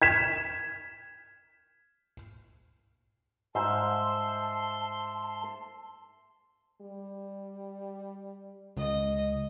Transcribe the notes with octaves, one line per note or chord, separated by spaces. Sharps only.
G#6 B6 E7
G#2 C5 E5 F5 A5 C6
G3
C#2 D#5